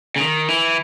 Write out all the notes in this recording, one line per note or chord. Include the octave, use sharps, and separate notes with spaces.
C#3
D#3
E3